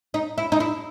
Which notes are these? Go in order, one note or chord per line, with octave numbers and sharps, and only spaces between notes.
D#4
E4
D#4
E4